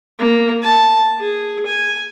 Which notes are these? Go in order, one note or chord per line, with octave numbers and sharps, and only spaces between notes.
A#3
A5
G#4
G#5